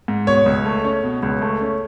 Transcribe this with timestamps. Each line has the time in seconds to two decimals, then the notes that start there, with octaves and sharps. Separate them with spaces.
0.08 G#2
0.27 B2 C#5
0.46 C#2
0.65 A3
0.85 C#4
1.03 B2
1.23 C#2
1.42 A3
1.61 C#4